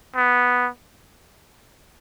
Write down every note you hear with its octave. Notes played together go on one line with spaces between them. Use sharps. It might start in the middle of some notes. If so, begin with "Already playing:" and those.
B3